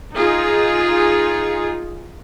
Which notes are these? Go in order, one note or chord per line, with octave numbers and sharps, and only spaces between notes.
D#4 F4 G#4